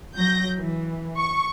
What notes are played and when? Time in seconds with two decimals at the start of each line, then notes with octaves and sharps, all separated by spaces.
0.16 F#3 G6 A#6
0.59 E3
1.17 C#6